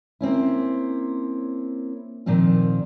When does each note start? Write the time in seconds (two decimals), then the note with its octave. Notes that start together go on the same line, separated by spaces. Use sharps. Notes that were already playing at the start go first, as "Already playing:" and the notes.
0.21 A#3 C4 C#4 E4
2.26 A#2 D#3 F3 C4 F4